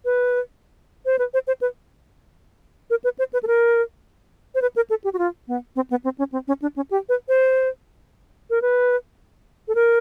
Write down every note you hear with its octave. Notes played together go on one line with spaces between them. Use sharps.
B4
C5
B4
C5
C5
B4
A#4
B4
C5
B4
A4
A#4
C5
B4
A#4
A4
G4
F#4
F4
B3
C4
B3
C4
C#4
C4
C#4
D4
C#4
G4
B4
C5
A#4
B4
A4
A#4